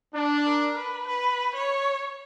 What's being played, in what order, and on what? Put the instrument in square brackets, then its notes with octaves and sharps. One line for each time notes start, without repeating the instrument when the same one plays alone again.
[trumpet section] D4
[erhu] A#4
B4
B4
C#5